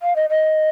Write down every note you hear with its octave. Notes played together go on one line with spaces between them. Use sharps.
F5
D#5
D#5